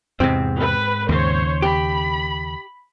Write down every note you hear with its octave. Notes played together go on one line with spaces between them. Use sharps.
E2 G#2 C3 C4
B4
D#2 C#3 C5 C#5
G4 B5